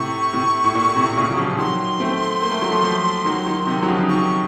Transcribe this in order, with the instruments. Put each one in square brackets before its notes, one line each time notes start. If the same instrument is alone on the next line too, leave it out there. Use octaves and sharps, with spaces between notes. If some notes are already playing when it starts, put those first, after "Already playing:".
Already playing: [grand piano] A2 C3 [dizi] C#6
[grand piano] A2 C3
A2
A#2
A2 C3
C3
A#2 C#3
F#3
C#3 F3
F3
[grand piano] D#3 F#3 [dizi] C6
[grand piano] A3 C4
A#3
A3
F#3
F3 A3
F3 A3
D#3 F#3
D#3 F#3
C3 D#3
F#3
C#3 F3
C#3
[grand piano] C3 D#3 [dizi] C#6